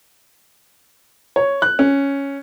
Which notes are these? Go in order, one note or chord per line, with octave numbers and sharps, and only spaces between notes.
C#5
F#6
C#4